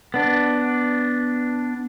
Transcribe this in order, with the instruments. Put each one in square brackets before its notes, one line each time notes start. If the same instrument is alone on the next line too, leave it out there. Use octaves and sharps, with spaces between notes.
[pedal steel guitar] B3 D4